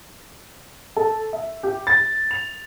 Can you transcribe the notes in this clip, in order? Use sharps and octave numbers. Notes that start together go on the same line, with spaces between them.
A4
E5
G4
A6
F7